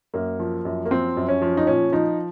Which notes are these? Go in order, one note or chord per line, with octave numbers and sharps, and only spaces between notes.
F#2 A#3
F3
F#2
A#3
F3 C4
F#2
C#4
F3
D#4
A#2 C#4
F3 D#4